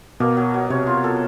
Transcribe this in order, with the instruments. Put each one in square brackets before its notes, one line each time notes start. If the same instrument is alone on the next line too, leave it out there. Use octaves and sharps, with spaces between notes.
[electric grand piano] B2 [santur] A#3
[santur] F#3
F#3
[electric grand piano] C3 [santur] C#5
[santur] F4
A4